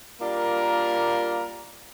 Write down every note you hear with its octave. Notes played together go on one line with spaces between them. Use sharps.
G3 A#3 D4 F4 A#4